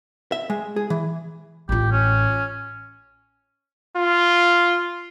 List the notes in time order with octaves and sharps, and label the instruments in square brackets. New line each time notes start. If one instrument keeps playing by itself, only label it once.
[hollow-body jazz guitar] E5
G#3
G#4
E3
[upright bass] A1 F4 [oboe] G4
[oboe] C#4
[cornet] F4